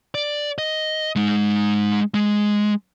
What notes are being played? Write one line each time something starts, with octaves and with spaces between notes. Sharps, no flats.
D5
D#5
G#3 D#4
G#3